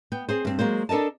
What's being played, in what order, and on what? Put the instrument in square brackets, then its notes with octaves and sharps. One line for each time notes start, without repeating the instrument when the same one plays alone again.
[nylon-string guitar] B3 G5
C4 G#4 C5
G2 C4
F#3 G#3 A#3 C5
D4 A4 A#4 D#5 A5